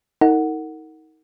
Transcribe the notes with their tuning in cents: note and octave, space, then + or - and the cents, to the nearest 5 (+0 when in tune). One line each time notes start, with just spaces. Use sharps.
D#4 +30 A#4 -35 F#5 +0